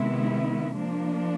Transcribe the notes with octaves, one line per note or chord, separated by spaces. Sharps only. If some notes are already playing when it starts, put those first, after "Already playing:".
Already playing: C3 D#3 G#3 B3 E4
F3 A#3 D4